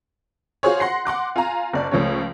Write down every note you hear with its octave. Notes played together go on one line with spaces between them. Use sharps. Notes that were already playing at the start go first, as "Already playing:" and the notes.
F4 F#4 G#4 C5 C#5
F#5 C6 A#6 C7
F#5 C6 D6 F#6
F4 G#5 A#5
F#1 D5
C#2 F3 A3 C#5